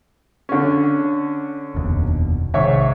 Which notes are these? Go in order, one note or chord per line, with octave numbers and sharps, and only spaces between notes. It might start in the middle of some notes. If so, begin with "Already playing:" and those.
D3 C#4
F1 D#2 B2
B1 G#2 C3 D#3 C#5 E5